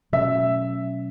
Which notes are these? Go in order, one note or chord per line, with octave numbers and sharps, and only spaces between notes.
B2 F#3 A3 C#4 E5